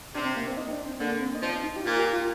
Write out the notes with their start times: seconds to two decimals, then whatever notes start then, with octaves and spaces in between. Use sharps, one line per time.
0.15 C3 D4
0.25 C4
0.36 A#3
0.47 C4
0.57 D#4
0.67 D#4
0.72 D4
0.85 C4
1.00 D3 A#3
1.21 C4
1.35 D#4
1.42 F3 D4
1.63 D#4
1.76 G4
1.84 A#2 F4
1.98 G4
2.13 F4